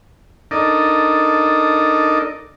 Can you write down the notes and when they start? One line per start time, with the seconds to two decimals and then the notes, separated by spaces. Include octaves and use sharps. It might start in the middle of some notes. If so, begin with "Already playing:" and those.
0.51 D4 D#4 A4 A#4 D5 D#5